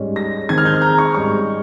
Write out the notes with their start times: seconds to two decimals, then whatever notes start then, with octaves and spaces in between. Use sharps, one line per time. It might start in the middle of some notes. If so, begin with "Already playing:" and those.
Already playing: G#2 G3 C#4
0.16 A#6
0.49 D#3 G#3 C4 D#4 G#6
0.58 F6
0.65 G6
0.74 F6
0.82 A#5
0.98 C#6
1.14 G#2 G3 C#4 C#6